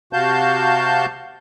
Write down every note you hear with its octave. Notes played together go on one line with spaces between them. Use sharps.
C3 F#4 F5 A5 G6